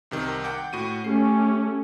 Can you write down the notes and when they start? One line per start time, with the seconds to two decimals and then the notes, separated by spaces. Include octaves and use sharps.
0.11 C2 C3 D#3
0.44 F#5 G5 D6
0.73 A2 F#4 D#7
1.04 A3 C#4 G4 C7